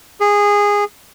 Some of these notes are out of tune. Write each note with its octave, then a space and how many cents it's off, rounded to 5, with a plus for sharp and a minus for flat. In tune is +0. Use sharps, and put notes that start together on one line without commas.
G#4 -15